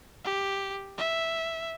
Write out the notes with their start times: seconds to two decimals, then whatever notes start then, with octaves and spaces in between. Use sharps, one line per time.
0.24 G4
0.98 E5